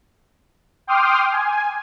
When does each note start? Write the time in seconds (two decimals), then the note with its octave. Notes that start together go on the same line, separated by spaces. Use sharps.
0.87 G5 C6 D6 D#6 F6
1.32 G#5